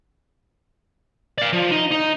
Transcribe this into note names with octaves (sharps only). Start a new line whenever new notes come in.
D5 F5
F3
D#4
D#4